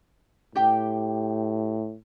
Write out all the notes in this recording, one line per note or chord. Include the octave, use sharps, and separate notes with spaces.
A2 G4 G5